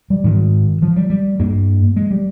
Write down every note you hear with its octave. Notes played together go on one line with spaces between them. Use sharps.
G3
G#2 D#3
F3
G3
G3
G2 A#3
G#3
G3